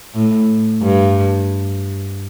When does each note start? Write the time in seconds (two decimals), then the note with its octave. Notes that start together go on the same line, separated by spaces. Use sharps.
0.14 A2
0.82 G2